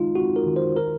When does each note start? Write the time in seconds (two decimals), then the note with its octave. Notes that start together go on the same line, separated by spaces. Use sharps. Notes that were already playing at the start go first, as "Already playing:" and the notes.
Already playing: D#3 G#3 D#4 F4
0.15 C4 F#4
0.36 A#4
0.46 D#3
0.56 C5
0.77 D#3 A#4